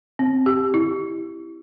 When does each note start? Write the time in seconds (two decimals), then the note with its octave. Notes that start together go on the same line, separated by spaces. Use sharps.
0.19 C4
0.46 G4
0.74 E4